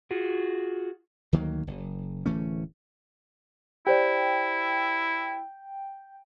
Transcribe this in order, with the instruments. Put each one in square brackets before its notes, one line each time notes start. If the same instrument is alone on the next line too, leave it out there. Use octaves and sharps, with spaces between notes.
[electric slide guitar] F4 F#4 G#4
[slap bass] D2 D#3 F#3 A#3
F#1
D1 E3 A3 C#4
[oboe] E4 [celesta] G4 C5 D5 [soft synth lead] G5